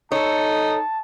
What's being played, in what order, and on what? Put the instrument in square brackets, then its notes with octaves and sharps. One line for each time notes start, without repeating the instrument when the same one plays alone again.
[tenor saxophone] D#4 [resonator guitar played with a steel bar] A4 C#5 [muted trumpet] A5